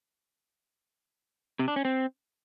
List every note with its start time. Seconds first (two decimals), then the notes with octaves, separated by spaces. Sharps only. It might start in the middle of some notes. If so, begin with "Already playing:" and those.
1.59 C3
1.68 D4
1.76 C#4
1.85 C4